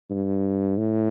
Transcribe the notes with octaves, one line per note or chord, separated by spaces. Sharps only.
G2
A2